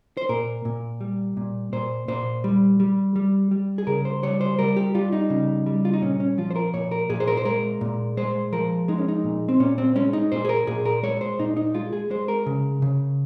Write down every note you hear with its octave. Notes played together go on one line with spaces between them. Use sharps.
C5
A#2 A#4
A#2
G3
A#2
A#2 C5
A#2 C5
G3
G3
G3
G3
G#4
C#3 A#4
C5
G3 C#5
C5
G3 A#4
G4
G3 F4
D#4
C#3
G3
F4
D#4
A#2 C#4
C#4
F3 F4
C5
A#4
A#2 C#5
A#4
A#2 G#4
C5
A#4
C5
G#3 A#4
A#2
G#3 C5
F3 A#4
G#3 D#4
C#4
D#4
A#2
C4
A#2 C#4
C4
G#3 C#4
D#4
A#2 C5
G#4
A#4
A#2 G#4
A#4
G#3 C#5
C5
A#2 D#4
D#4
G#3 F4
G#4
G#3 C5
A#4
C#3
C#3